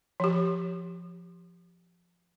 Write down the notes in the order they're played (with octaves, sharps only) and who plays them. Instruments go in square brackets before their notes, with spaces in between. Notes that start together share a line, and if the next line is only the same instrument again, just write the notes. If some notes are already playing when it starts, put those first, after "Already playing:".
[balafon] F3 G4